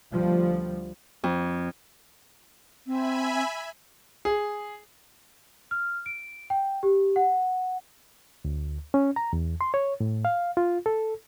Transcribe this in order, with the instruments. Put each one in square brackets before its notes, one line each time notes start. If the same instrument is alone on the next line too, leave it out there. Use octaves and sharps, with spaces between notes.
[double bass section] D2 F3 G3
[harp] F2
[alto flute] C4 [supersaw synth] E5 G#5 B5
[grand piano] G#4
[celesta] F6
D7
G5
G4
F#5
[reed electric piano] D2
C#4
A#5
E2
C6
C#5
A2
F5
F4
A4